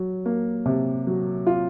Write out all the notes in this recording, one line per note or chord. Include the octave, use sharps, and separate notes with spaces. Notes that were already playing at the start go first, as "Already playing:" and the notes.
Already playing: F#3
A#3
C3
F#3
F4